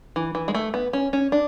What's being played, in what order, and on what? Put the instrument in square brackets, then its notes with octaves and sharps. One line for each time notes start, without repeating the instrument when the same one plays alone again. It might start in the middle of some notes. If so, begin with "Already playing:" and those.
[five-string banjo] E3
E3
G#3
A3
B3
C#4
C#4
D4